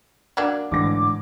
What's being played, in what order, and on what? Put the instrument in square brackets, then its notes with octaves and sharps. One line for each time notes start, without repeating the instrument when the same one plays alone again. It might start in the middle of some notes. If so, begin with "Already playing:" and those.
[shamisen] F#3 A#3 D4 [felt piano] D6 G#6
[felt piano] A1 D3 A#6 [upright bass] G#2 [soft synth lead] D6